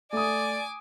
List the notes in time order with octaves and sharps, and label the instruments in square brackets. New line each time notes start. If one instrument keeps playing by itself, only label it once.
[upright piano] A3 D#6 [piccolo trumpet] D5 [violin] G#5 D6